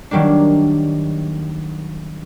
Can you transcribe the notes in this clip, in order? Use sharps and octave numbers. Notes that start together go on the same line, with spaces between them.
D#3 F#3 G3 A#3 D4